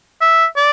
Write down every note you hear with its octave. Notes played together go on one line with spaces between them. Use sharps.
E5
D5